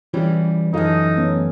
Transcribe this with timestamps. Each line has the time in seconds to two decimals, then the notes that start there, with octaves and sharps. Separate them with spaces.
0.14 E3 G3 C#4 F4 G4
0.74 F#2 E3 D#4 F4 A4 F5
1.16 A3 B3 C#4